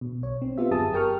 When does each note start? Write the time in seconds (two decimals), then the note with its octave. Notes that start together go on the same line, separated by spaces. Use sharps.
0.01 B2
0.21 B1 C#5
0.42 C4
0.58 B3 F4 G4 E5
0.71 G1 F#2 G#4 A5 D#6
0.93 G4 A#4 G5 C#6 F6